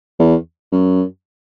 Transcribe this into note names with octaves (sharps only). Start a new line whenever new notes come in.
E2
F#2